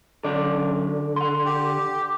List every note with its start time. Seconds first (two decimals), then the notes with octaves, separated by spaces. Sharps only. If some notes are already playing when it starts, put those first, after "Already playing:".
0.24 D3 F#3 C#4 D5
1.16 F#5 C6
1.45 G4